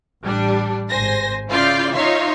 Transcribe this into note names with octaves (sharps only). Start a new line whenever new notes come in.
A1 G3 D4
G#1 C5 G#5 A#6
C#3 E4 F4 D5 F5 G6
D#4 F4 C#5 E5 F5 C6